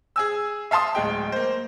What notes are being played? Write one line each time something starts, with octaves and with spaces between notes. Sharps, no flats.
G#4 G#5 E6
E5 F5 A5 C6 D#6
D1 G#3 G5
A#3 C5